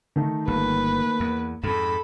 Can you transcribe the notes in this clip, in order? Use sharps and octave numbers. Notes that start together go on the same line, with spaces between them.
D#3 A3 D#4
G1 A#3 B4
E2
F2 G#2 A4 B5 E7